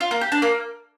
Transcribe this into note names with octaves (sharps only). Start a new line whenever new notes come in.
F4
A#3
G4
D4
A#3